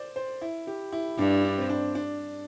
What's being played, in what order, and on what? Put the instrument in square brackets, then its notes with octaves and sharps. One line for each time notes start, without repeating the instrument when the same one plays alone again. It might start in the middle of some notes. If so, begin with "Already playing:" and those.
Already playing: [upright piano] C5 D5
C5
E4
G4
E4
[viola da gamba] G2 [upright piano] D4
[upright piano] D4
C4
D4
D4